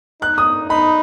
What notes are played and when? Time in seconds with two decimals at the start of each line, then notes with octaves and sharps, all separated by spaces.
0.21 D#4 F#6
0.38 D#6
0.70 D#4 B5